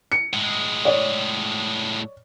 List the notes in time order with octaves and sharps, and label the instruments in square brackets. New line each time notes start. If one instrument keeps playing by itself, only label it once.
[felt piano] C#7
[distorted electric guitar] A2 G#3
[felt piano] C#5 D5